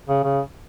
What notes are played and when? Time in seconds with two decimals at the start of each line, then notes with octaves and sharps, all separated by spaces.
0.09 C#3
0.24 C#3